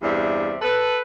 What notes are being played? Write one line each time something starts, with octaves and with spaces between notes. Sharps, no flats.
E2 G2 C3 D5 E5
A4 B4